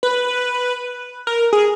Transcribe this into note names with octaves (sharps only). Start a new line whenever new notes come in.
B4
A#4
G#4